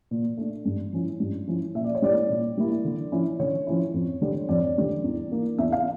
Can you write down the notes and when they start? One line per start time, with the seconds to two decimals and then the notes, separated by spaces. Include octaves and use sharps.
0.11 A#2
0.38 A3 D4
0.65 G2
0.93 F3 C#4 E4
1.20 G2
1.47 F3 C#4 E4
1.75 A#2 E5
1.84 D5
1.95 C#5
2.02 G3 A#3 E4 D5
2.30 A#2
2.57 G3 A#3 E4
2.85 D3
3.12 F3 C#4 E4
3.40 D3 C#5
3.67 F3 C#4 E4
3.94 F2
4.21 D3 G3 D4
4.49 F2 D5
4.77 D3 G3 D4
5.04 E2
5.31 E3 A#3 D4
5.58 E2 E5
5.72 F5